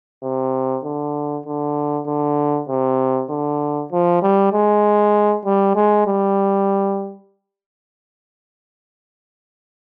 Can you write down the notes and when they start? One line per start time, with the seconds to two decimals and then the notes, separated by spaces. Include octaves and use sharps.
0.23 C3
0.84 D3
1.46 D3
2.07 D3
2.69 C3
3.29 D3
3.92 F3
4.22 G3
4.53 G#3
5.45 G3
5.75 G#3
6.06 G3